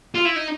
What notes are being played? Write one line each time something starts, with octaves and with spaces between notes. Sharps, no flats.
F4
E4
D#4